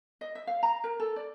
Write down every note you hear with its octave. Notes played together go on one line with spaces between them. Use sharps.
D#5
E5
F5
A#5
A#4
A4
D5